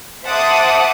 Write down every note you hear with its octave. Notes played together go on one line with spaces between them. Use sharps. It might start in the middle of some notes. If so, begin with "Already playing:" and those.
C5 E5 F#5 A5 D6 D#6